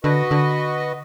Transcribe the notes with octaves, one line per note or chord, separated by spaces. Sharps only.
D3 F#4 B4 D#5
D3